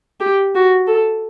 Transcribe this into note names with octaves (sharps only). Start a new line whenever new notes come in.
G4
F#4
A4